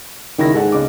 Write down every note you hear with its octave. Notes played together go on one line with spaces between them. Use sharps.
C#2 D#3 E4 A#6
G#2 G#4 A4 F#5
C#2 D#5 D6